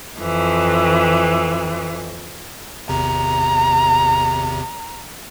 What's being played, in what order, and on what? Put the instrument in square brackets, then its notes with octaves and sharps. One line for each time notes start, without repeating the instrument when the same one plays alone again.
[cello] F2 E3
[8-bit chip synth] G#1 E2 C3 [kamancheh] A#5